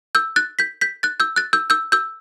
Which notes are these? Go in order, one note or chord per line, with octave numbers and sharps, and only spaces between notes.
E6 G6
F#6 A6
G6 B6
G6 B6
F#6 A6
E6 G6
F#6 A6
E6 G6
E6 G6
E6 G6